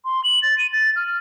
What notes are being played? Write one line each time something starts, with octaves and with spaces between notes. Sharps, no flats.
C6
F#7
A6
D#7
A6
F6